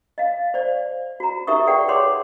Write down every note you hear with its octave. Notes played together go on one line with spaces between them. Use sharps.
D#5 F5
C5 D5
F#4 A#5
D#4 G4 A#4 E5 C#6 D#6
G#4 B4 D5 F#5 G5
B4 C#5 F#5 C6 D6